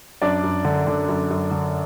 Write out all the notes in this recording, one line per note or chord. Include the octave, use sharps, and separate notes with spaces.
F#2 D4 D5
F#2
D3
D3
F#2
F#2
D3